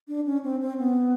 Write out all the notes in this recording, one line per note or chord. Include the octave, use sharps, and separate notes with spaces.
D4
C#4
C4
C4
B3